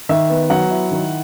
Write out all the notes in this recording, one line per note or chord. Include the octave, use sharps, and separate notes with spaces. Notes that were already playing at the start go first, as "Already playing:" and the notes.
D#3 E5
B3
F#3 F#5
E4
D#3